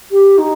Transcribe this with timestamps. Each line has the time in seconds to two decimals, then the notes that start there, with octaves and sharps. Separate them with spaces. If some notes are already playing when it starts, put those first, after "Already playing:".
0.11 G4
0.37 D#4